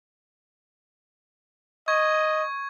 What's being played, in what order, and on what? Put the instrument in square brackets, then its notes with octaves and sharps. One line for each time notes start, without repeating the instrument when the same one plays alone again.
[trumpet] D#5 [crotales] C#6 G#6